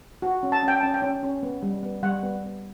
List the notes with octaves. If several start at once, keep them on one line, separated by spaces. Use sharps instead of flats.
F#4
C#4
A5
C#4
G5
C#4 A5
G5
C#4
C#4
B3
G3
B3
G3 F#5
B3
B3